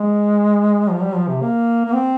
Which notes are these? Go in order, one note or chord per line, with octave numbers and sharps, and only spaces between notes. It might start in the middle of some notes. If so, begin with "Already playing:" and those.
Already playing: G#3
F3
G3
F3
C3
A#3
A#3
C4